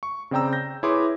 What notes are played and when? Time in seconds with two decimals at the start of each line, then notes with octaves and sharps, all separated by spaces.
0.03 C#6
0.31 C#3 C4 D5 G5 A#5 E6
0.53 G6 A#6
0.83 E4 G#4 B4 C#5 C6 D6